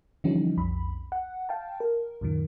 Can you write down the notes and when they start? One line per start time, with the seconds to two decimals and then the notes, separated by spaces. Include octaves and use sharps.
0.24 D3 E3 F3 G3 C#4 D#4
0.57 B1 F2 B5
1.12 F#5
1.49 F5 G5 A5
1.80 A#4
2.21 C#2 F#2 A#2 D#3